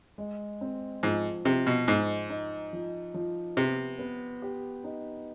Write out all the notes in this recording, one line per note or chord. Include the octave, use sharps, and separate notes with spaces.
G#3
C4
G#2 F3
C3 F3
B2
G#2 D#4
D#4
F3
F3
C3 B3
B3
G4
D#4